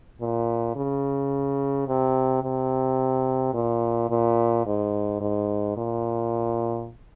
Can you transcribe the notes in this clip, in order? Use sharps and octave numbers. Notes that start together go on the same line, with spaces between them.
A#2
C#3
C3
C3
A#2
A#2
G#2
G#2
A#2